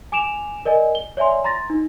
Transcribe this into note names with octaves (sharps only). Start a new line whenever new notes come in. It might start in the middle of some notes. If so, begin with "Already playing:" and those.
G#5 D6 D7 E7 F7
A#4 D5 D#5 G#5
G7
C#5 D5 E5 G#5 C6
A#5 C6 A6 A#6
D#4